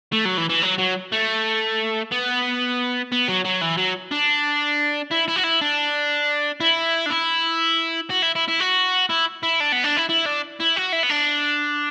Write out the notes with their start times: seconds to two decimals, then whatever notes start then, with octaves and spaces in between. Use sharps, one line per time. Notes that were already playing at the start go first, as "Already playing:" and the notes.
0.12 A3
0.25 F#3
0.37 E3
0.50 E3
0.63 F#3
0.79 F#3
1.12 A3
2.12 B3
3.12 B3
3.28 F#3
3.44 F#3
3.61 E3
3.77 F#3
4.12 D4
5.11 E4
5.28 E4
5.36 F#4
5.43 E4
5.61 D4
6.60 E4
7.06 D4
7.10 E4
8.10 F#4
8.22 E4
8.35 E4
8.48 E4
8.60 F#4
9.10 E4
9.43 E4
9.60 D4
9.72 B3
9.84 D4
9.97 E4
10.10 E4
10.26 D4
10.60 E4
10.76 F#4
10.92 E4
11.03 B3
11.09 D4